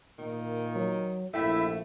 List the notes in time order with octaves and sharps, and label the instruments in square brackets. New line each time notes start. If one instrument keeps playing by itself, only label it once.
[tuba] A#2 [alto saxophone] D#3
[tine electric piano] F#3
[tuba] A#1 [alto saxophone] A3 [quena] E4 [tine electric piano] E5 G5 B6